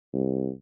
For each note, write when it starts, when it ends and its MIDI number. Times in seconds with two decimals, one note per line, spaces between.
0.13 0.51 36